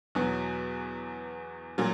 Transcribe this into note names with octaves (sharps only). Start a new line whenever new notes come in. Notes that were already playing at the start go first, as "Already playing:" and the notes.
E2 B2 F#3 B3 F#4
A#2 F#3